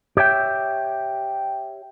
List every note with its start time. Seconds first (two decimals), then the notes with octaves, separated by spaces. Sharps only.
0.17 G4 C#5 E5 G5